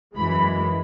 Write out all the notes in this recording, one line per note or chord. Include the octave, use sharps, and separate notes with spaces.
F#2 E3 G#3 B5